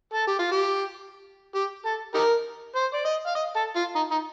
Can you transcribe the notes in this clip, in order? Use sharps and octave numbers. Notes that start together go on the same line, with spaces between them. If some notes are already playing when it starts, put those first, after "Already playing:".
A4
G4
F4
G4
G4
A4
D#4 G4 A#4
C5
D5
D#5
F5
D#5
A4
F4
D#4
D#4